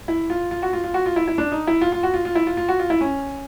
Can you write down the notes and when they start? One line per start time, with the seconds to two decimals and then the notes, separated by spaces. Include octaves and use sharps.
0.08 E4
0.30 F4
0.51 F4
0.62 F#4
0.73 F4
0.84 F4
0.94 F#4
1.06 F4
1.16 E4
1.28 E4
1.38 D4
1.52 D#4
1.67 E4
1.81 F4
1.92 F4
2.03 F#4
2.14 F4
2.25 F4
2.35 E4
2.47 F4
2.57 F4
2.68 F#4
2.79 F4
2.90 E4
3.01 C#4